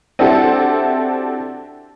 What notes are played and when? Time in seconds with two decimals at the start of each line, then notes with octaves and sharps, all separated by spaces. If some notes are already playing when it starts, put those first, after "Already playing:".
0.19 C4 D4 E4 F#4 G4 A4